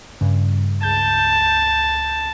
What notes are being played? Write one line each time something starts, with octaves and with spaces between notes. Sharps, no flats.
G2 C#3
C#2 A5 G6